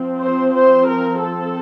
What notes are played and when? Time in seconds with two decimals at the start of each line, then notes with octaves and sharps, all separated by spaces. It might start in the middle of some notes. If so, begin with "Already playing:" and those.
Already playing: F3 C4
0.21 C5
0.54 C5
0.89 A#4
1.23 A4